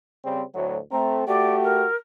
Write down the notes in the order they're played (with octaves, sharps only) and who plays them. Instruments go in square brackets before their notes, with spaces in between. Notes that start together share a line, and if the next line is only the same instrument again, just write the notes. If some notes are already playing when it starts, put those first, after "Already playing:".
[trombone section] C#3 G3 C4
D2 A2 F#3
[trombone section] A3 C4 [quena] A#5
[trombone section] A3 F#4 G4 [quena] D5
[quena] A#4